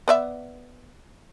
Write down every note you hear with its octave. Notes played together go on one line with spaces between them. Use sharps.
B3 D5 E5